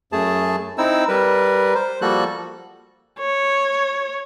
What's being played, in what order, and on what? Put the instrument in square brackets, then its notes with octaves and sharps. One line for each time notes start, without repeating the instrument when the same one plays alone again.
[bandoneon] F#2 A3 G#4 A5
C4 D#4 E4 E6
G3 A#4 B4
C5
F3 G3 A#3 F#4 A4 F#6
[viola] C#5